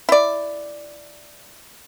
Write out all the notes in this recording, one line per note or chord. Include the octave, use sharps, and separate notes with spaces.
E4 D5